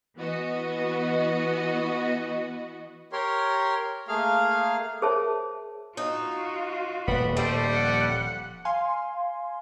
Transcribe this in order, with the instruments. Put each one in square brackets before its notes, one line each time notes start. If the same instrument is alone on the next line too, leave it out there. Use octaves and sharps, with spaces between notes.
[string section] E3 B3 F#4 D#5
[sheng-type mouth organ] G4 A#4 C#5 C6
A3 A#3 G#4 F5 F6
[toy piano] G#4 A#4 C5 C#5 E5 A5
[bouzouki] D#4 [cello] F4 F#4
[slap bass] D#1 [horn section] G3 B3 B5
[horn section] G3 [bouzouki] A3 [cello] C5
[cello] F3 F#5
[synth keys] F5 G#5 C6